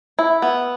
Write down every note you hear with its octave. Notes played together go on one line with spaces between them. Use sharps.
E4
B3